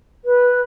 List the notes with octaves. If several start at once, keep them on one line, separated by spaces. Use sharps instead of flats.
B4